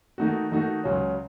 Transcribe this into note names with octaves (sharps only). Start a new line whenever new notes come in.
D#3 A3 D#4 F#4
D#3 A3 D#4 F#4
C#2 C#3 F#3 C#4